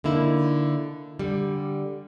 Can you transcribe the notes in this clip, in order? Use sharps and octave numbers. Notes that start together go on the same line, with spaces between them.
D3 A#3 D#4 E4
D3 G3